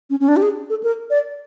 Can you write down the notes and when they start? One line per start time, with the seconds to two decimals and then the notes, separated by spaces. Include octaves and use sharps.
0.10 C#4
0.20 C#4
0.28 D4
0.37 G4
0.42 G#4
0.70 A4
0.83 A#4
1.10 D5